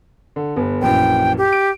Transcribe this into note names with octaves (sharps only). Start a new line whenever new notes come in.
D3
G1 B4
A#1 F#2 E3 G5
G4
D7